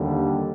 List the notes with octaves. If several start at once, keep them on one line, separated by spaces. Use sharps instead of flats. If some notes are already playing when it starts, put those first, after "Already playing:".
Already playing: D#2 D3 G3